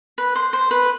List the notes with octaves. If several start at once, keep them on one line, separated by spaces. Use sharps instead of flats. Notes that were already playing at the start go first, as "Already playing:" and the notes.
B4
C5
C5
B4